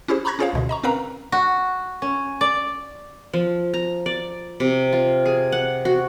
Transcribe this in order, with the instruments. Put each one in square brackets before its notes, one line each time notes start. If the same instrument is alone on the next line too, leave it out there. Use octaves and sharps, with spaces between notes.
[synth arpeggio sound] C#4 E4 G4 G#4 C5
A#5 B5 C#6 F#6 G#6 A#6
C#4 F4 G#4 C5 C#5 F5
C#2 B2 D3
D#5 A#5 C#6
C4 C#4 A#4 B4 F5 A#5
[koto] F#4
C#4
D5
[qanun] F3
A#5
D5
C3
F4
G#4
F#5
F#4